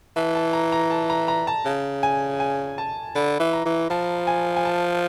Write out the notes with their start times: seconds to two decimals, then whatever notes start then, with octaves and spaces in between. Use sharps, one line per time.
0.16 E3 A5
0.35 A5
0.53 A#5
0.72 A#5
0.91 A5
1.10 A#5
1.28 A#5
1.47 A5
1.65 C#3
2.03 G#5
2.40 G#5
2.78 A5
3.15 D3 B5
3.40 E3
3.53 A#5
3.65 E3
3.90 F3 A5
4.27 G#5
4.56 G#5
4.65 A5